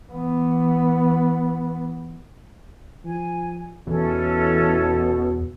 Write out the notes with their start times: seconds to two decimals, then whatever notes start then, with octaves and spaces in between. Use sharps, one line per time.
0.11 E3 B3
3.04 F3 G#5
3.87 E2 B2 C#4 E4 A4